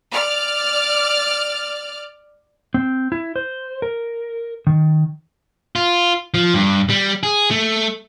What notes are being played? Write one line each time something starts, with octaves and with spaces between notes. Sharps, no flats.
D5 F6
C4
E4
C5
A#4
D#3
F4
F3
G2
G3
G#4
A3